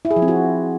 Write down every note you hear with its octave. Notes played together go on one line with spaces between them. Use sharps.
E4
G#4
F3
C4
F#4